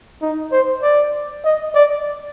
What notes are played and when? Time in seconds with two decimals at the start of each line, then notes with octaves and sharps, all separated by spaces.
0.22 D#4
0.52 C5
0.82 D5
1.45 D#5
1.75 D5